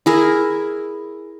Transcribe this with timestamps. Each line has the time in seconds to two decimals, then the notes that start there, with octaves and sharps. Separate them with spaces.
0.06 E4 G#4 A#4